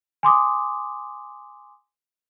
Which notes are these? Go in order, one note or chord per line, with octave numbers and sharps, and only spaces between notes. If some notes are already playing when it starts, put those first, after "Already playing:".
G#5 C6 D6 D#6